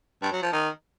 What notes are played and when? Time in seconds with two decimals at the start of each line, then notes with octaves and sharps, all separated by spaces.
0.22 G2
0.32 F#3
0.42 F3
0.52 D#3